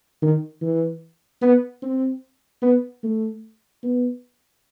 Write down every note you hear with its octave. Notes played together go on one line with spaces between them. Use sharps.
D#3
E3
B3
C4
B3
A3
B3